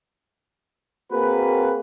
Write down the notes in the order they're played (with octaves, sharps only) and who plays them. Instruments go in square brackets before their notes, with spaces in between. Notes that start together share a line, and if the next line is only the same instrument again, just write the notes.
[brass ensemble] A#3 C4 F#4 G#4 A#4 B4